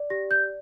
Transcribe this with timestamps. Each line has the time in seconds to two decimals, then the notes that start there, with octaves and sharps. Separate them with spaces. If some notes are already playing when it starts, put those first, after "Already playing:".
Already playing: D5
0.10 G4 A#6
0.31 G6